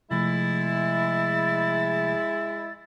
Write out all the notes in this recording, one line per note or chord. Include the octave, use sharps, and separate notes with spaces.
C3 F3 G#3 A3 E4 A6